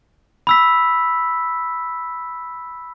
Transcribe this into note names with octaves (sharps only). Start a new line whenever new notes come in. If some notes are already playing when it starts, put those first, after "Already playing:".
B5 E6 B6